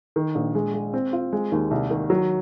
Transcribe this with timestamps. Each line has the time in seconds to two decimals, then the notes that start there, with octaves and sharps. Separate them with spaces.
0.16 D#3
0.35 A#1
0.55 G#3
0.74 G#3
0.93 C4
1.13 F4
1.32 G#3
1.52 D#2
1.71 C2
1.91 D#3
2.10 F#3